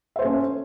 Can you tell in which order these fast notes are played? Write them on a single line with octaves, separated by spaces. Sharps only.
E5 C5 A4 C#4